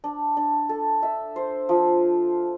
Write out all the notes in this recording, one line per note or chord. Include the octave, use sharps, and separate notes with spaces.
D4
D4
A4
E5
C5
F3